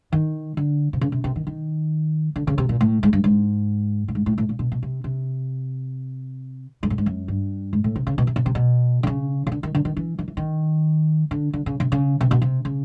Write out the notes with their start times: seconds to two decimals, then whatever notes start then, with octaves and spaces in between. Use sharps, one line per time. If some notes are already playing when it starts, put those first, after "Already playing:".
0.13 D#3
0.57 D3
0.93 C3
1.01 C#3
1.12 C3
1.24 C3
1.36 D#3
1.47 D#3
2.36 D3
2.47 C#3
2.58 C3
2.69 A#2
2.81 A2
3.03 G#2
3.13 G2
3.24 G#2
4.08 A2
4.15 G#2
4.26 A2
4.38 A2
4.49 A#2
4.59 B2
4.72 B2
4.83 C3
5.04 C3
6.83 G#2
6.90 A2
6.98 G#2
7.06 F#2
7.28 G2
7.73 G#2
7.84 A2
7.96 C3
8.07 C#3
8.18 B2
8.27 C3
8.36 B2
8.46 C3
8.55 B2
9.03 D3
9.07 C#3
9.47 C#3
9.52 D3
9.63 D#3
9.75 D3
9.85 D#3
9.97 E3
10.19 D#3
10.28 E3
10.37 D#3
11.31 D3
11.53 D3
11.66 C#3
11.80 C3
11.92 C#3
12.21 C3
12.31 B2
12.42 C3
12.65 C#3